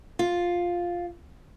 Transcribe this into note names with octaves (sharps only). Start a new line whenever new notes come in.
F4